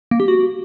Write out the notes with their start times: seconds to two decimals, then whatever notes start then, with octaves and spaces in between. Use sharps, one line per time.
0.11 A#3
0.20 G4
0.28 F#4